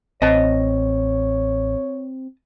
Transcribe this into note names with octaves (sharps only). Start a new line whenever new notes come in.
A1 C4 C#5 D#5 A5